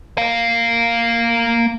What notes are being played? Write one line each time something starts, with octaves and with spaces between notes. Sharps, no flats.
A#3 F5